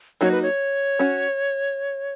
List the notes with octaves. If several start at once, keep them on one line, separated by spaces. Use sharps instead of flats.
F#3 A#3 D#4 F#4 C#5
B4
C#5
C#4 F#4